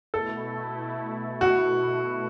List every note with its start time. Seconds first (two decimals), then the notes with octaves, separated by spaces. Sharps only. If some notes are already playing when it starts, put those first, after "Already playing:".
0.14 B2 A3 E4 A4
1.41 F#4